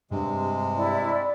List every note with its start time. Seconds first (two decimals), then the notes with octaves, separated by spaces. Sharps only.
0.11 G2 C3 G#3
0.77 E4 D5